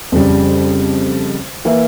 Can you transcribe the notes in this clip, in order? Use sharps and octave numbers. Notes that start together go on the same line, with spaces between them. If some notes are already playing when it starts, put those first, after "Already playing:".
F2 C#3 G3
E3 A#3 E4